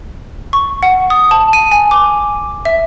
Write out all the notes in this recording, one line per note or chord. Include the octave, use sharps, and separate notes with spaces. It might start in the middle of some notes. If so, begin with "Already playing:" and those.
C#6
F#5
D#6
A5
D#7
G#5
D6
E5